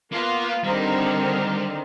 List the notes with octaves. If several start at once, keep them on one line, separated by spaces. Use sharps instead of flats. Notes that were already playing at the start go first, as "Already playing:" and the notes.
A#3 B3 F4
D3 D#3 G3 C4